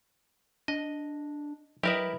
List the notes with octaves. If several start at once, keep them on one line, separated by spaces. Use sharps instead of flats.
D4 D#5
F#3 E4 G4 A#4 B4 D#5 E5